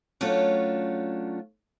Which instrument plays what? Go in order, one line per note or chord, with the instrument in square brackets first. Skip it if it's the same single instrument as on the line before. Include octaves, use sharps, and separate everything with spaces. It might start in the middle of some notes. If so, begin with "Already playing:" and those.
[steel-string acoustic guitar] F#3 A3 C#4 D4 F4 C#5